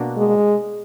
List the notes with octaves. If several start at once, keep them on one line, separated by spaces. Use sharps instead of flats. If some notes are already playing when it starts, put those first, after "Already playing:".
Already playing: B2 A#3 D4 F#4
G#3